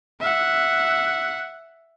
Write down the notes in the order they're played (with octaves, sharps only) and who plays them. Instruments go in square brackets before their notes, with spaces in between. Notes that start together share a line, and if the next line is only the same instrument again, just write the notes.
[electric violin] E5 F#5